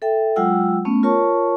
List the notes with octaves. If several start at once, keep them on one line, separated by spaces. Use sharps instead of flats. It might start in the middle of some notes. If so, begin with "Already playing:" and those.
A4 E5 G5
F#3 G#3 F4 F#5 G5 E6
A3 B3 C#4
F4 A#4 C#5 A5 C#6